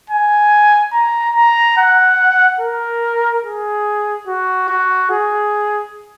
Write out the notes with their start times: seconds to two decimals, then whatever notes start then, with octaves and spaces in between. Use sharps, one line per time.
0.10 G#5
0.93 A#5
1.36 A#5
1.78 F#5
2.61 A#4
3.43 G#4
4.28 F#4
4.69 F#4
5.11 G#4